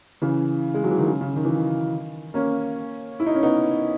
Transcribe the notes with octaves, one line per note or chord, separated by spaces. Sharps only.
C#3 E3
G#3
F#3
E3
D#3
C#3
C#3
D#3
E3
D#3
A#3 C#4
E4
D#4
C#4
B3 D#4